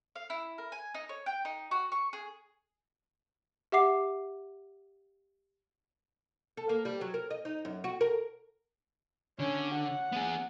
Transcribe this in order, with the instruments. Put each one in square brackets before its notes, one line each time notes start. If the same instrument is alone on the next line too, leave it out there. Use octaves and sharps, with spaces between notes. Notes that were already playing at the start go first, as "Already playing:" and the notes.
[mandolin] F5
E4
A#4
G#5
D#4
C#5
G5
D#4
F#4
C#6
G#4
[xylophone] G4 E5 F#5 D6 C7
[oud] A4
A#3
G3
F#3
A#4
D#5
D#4
F#2
F#4
A#4
[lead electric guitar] D3 [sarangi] C#4
[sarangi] F#5
[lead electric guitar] B3 G#4